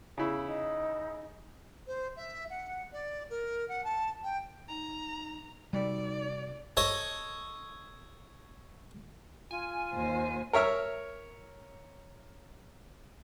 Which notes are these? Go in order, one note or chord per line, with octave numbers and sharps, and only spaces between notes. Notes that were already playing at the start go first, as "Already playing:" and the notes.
C#3 E4
D#4
C5
E5
F#5
D5
A#4
F#5
A5
G5
D#4 A#5
C3 G3 D#4 F#4 A4 D5
A4 C#5 D#5
F4 G#5
D#2 C5
A#4 C#5 E5 F6